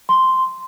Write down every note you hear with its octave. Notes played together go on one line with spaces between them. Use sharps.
C6